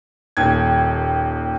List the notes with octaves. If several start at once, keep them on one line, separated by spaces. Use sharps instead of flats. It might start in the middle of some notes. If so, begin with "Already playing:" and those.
D#1 D#2 G#6